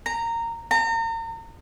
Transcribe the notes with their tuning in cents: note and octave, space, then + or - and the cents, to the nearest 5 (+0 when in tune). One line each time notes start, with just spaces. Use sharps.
A#5 -15
A#5 -35